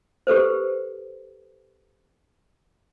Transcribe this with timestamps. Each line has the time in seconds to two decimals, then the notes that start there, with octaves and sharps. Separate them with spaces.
0.27 G4 A4 B4 C5